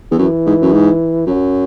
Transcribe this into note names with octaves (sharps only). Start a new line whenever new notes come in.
E2
F#2 E3
G#2
F#2
G#2
F#2 F#3